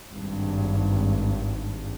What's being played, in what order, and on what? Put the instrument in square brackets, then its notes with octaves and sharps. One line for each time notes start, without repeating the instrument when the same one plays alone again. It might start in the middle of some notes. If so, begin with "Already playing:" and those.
[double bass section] G#1 G2